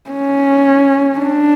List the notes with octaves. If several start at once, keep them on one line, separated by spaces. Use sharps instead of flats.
C#4
D4